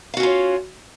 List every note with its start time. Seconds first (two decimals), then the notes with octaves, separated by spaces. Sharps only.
0.14 F5
0.17 F#4
0.20 C#4
0.23 F4
0.26 C#5